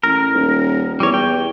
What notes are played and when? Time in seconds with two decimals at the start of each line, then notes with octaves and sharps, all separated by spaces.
0.03 A1 A#4
0.33 D#1
1.00 E2 G3 C#5
1.14 G5